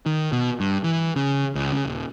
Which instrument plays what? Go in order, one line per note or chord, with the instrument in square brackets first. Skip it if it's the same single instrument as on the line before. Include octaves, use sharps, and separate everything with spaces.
[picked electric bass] D#3
B2
G2
E3
C#3
C#2
C#3
D#1